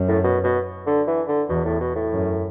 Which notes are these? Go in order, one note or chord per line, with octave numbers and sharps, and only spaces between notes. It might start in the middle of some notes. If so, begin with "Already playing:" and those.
Already playing: F#2
A2
B2
B2
D3
E3
D3
E2 B2
A2
B2
A2
F#2